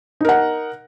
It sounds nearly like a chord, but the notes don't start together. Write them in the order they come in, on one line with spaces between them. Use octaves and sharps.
D#4 A#4 F#5